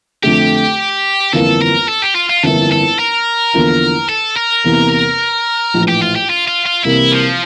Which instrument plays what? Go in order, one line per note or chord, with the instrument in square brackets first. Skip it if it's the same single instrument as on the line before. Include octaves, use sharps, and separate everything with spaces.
[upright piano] F2 D3 A3 [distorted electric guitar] G4
[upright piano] G1 F2 E3 A#3 F4 [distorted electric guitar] A4
[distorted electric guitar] A#4
A4
G4
F4
F4
[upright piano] G1 F2 E3 A#3 E4 [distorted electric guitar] A4
[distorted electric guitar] A4
A#4
[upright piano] E2 D3 F3 A#3 E4
[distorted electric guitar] A4
A#4
[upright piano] E2 C3 E3 A#3
A#1 A2 E3
[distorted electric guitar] G4
F4
G4
F4
F4
F4
[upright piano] C2 C3 E3 A#3 [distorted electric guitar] E4
[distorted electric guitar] F3